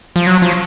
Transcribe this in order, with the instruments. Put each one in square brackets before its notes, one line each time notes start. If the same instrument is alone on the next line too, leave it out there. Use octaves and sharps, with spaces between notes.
[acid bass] F3
F#3
F3